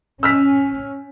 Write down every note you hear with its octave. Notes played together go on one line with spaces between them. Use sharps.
C#4 E6 F6 B6